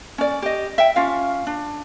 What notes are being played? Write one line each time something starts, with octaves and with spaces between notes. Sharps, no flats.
C#4 D5
G4 D#5
E5 G5
C#4 F4 F5
D4